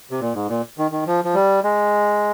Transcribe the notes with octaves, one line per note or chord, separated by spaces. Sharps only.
C3
A#2
G#2
A#2
D#3
D#3
F3
F3
G3
G#3